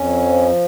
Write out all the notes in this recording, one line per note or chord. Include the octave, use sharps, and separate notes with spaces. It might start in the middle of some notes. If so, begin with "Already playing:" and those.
Already playing: F2 C#4
F3